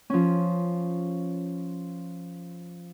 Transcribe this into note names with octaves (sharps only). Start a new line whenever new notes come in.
F3 C#4